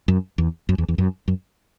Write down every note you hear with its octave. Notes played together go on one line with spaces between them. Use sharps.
F#2
E2
F#2
E2
E2
F#2
F#2